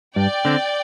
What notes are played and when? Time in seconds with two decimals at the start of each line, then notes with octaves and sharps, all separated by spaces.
0.16 G2 D5 G5
0.45 D3 C4